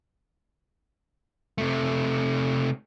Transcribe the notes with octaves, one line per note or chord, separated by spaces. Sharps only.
C3 A3